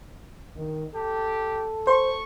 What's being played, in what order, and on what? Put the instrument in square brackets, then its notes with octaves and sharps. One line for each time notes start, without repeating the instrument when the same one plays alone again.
[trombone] D#3
[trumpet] G4 [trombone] A4
[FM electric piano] C5 [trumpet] C#6